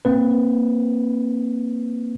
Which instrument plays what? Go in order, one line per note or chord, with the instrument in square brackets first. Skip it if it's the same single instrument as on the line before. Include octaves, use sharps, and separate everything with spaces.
[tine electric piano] A#3 C4 B4